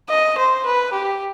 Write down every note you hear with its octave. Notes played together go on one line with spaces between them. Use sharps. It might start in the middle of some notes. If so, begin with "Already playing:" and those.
D#5
C5
B4
G4